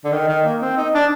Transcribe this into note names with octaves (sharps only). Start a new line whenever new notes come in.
D3
D#3
D#3
A#3
C4
D#4
D4